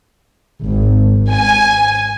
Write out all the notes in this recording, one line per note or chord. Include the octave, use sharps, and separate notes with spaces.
G#1
G#5